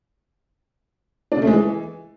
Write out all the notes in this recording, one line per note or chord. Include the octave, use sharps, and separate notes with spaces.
D4
C#3
A3
G#3
E3